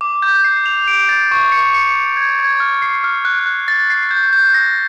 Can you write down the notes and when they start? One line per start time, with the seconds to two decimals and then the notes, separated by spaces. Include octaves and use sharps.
0.01 D6
0.22 G6
0.44 C7
0.66 F7
0.88 D7
1.09 A6
1.31 C#6
1.52 C#7
1.74 C#7
1.96 C#7
2.17 G#6
2.39 G#6
2.60 F6
2.82 C7
3.04 F6
3.25 F#6
3.46 F#6
3.68 A6
3.90 C7
4.11 G6
4.33 G6
4.54 A#6